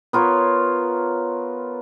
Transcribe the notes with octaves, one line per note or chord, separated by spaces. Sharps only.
B3 F4 A#4 C#5